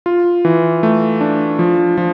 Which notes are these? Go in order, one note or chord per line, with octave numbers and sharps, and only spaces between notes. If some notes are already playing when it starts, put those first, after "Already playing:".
F4
E3
A3
D4
F3
F3